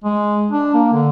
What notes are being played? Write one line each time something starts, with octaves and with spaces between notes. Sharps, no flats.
G#3
D4
A#3
D3